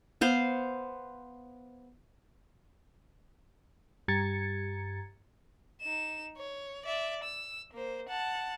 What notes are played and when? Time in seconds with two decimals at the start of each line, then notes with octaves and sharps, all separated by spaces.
0.21 B3 C5 F5
4.08 G2 G4 A#5 G#6 A6 C#7
5.81 D#4 E7
6.37 C#5
6.85 D5 E5
7.24 E6
7.73 A#3 C5
8.09 F#5 A5